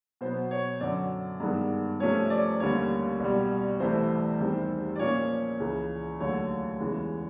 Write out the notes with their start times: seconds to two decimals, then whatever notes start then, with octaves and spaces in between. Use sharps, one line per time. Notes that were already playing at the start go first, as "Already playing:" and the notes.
0.21 B2 F#3 B3 C5
0.51 C#5
0.80 F#2 D3 F#3 D5
1.40 G2 D#3 G#3 B3
2.00 C3 F3 A3 C#4 C#5
2.30 D5
2.60 D#2 D3 G3 A#3 C#4 C#5
3.20 C2 B2 G3
3.80 C2 C3 E3 A3 C5
4.40 E2 C3 D#3 G3 C4
4.96 D5
4.99 A#2 F3 A#3 C#4 C#5
5.60 C#2 C#3 E3
6.20 D#2 D3 F#3 A3 C#5
6.80 E2 C#3 E3 G#3